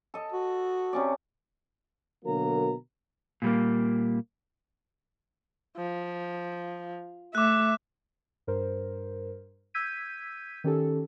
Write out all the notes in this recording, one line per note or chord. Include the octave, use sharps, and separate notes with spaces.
A4 D#5
F#4
C3 C#4 D5
B2 D3 F#3 A#3 A#4 A#5
A#2 G3 A#3
F3
A3 E5 D6 F#6
G2 A#4 C5
E6 G6 G#6 B6 D#7
D#3 C#4 G4 A4